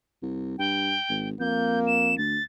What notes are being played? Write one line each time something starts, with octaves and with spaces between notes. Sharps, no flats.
C2
G2 G5
G#1
F2 A#3 G6
E7
D2 A6